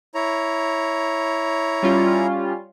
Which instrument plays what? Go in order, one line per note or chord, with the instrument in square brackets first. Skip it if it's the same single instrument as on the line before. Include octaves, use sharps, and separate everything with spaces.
[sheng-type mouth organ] E4 C#5 A#5
[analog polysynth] G3 C#4 F4